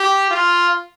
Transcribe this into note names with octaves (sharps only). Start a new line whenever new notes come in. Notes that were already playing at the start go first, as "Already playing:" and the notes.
Already playing: G4
F4